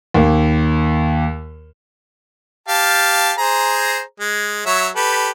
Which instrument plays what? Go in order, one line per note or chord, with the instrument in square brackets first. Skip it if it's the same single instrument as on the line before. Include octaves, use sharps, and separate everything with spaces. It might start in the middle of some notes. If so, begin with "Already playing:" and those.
[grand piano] D#2 A#3
[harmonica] G4 F5 A5
G#4 C5 A#5
G#3
F#3 C#5 E5
G4 A4 B4